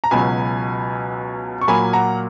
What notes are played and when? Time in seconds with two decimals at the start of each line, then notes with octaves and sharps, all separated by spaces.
0.04 A#5
0.11 C#2 B2 F#3 G#5 B5
1.61 C#6
1.68 A#2 F#3 A#3 G#5 B5
1.93 F#5 A#5